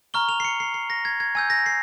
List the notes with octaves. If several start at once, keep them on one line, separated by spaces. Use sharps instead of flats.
A#5 C#6 F6 G7
F7
C7
C#7
C7
C7
A#6
G#6
G#6
G#5 E6 G6 G#6
A#6
C7